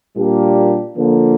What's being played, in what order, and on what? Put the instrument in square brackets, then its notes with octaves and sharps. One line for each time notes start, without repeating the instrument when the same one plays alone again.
[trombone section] A#2 G3 A#3 D4 G4
D3 F3 A#3